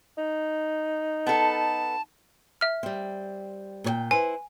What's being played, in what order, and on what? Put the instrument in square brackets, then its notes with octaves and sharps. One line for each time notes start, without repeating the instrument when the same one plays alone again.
[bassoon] D#4
[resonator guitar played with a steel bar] B3 A4 [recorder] A5
[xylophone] E5 F6
[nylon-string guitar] G3 C4
A#2 C#5 G5
[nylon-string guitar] E4 B4 C5 [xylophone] G#5